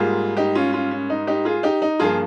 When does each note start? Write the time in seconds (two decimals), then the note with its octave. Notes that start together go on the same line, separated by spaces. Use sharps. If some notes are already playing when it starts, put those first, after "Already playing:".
Already playing: G#2 G3 A#3 F4 G#4
0.37 D#4 G4
0.55 C#4 F4
0.73 C#4 F4
0.91 C#4
1.10 D#4
1.27 D#4 G4
1.45 F4 G#4
1.63 D#4 G4
1.82 D#4
1.99 G2 F3 A#3 F4 G#4